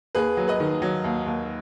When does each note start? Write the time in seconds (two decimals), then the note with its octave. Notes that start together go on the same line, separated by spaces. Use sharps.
0.15 D#2 G#4 B4
0.37 F#3
0.48 B4 D#5
0.60 D#3
0.82 F#3
1.04 D#2
1.26 D#2